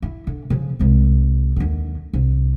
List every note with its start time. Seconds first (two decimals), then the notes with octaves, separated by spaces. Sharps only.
0.02 E4
0.27 D3
0.50 C#3 F3
0.79 C2 G#3
1.56 D#2 D3
2.13 C2